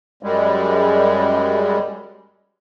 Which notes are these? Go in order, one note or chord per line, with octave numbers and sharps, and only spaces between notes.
F#2 G3 G#3